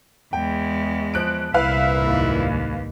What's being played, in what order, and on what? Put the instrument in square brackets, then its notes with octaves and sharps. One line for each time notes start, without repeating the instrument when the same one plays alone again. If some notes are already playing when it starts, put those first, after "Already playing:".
[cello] E2 G#3 [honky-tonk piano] G5
[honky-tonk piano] F3 F#6 D7
[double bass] C2 [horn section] A#2 E4 [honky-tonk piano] B4 F5 [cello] E5
[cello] D#2 G#2